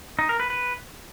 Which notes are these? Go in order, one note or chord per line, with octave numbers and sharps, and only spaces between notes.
D#4
A#4
B4
B4